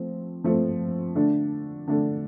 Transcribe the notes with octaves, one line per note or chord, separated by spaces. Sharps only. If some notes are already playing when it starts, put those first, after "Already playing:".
Already playing: F3 A3 C4
F3 A3 C4
D3 A3 D4
D3 A3 D4